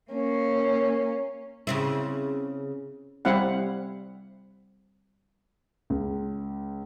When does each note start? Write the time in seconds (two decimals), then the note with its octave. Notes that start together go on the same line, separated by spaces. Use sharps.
0.11 A#3 C#4
1.67 C#3 C4 E4
3.25 G3 C4 E4 F5 F#5
5.90 C#2